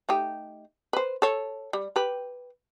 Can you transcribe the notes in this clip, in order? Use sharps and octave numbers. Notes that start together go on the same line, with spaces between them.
A3 D#4 G4
B4 C5
A4 C#5
G3
G4 B4